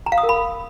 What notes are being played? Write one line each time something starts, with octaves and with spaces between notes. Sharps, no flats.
A#5
F5
D#6
A#4
B5